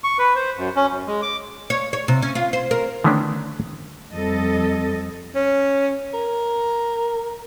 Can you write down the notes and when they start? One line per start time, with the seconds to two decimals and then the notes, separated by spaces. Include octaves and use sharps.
0.04 C#6
0.19 B4
0.35 C5
0.58 F#2
0.76 C#4
0.90 F#2
1.07 G#3
1.22 D6
1.70 C#5
1.93 C#5
2.08 C3
2.22 C#4
2.35 F4
2.53 C5
2.71 A#4
3.04 D3 D#3 A3 B3 C#4 D4
4.12 F2 G3 A4 D#5
5.35 C#4
6.14 A#4